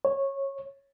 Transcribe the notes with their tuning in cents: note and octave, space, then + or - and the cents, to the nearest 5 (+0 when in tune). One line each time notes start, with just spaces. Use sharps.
C#5 -15